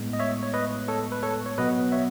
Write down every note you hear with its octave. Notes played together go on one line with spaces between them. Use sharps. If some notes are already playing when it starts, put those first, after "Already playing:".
Already playing: A2 G#3 B3
D#5
C#5 E5
C#5
B4 D#5
A4 C#5
B4
A4 C#5
C#5
B2 F#3 B3 B4 D#5
C#5 E5